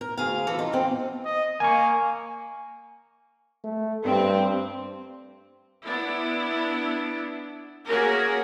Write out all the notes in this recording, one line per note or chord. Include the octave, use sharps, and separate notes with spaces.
A#4
D2 G#4 F5
E3 A4
D#4 F4
E2 F3 C4
D#5
A#3 G#5 C#6
A3
G2 C4
B3 D4 E4
A#3 C#4 F#4 G#4 A#4